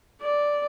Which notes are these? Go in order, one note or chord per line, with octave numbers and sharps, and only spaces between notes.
D5